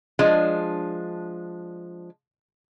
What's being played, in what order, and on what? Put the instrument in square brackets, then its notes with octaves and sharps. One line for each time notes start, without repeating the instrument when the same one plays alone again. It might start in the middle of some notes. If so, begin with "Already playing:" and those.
[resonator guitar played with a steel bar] F3 G#3 D4 [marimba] D#5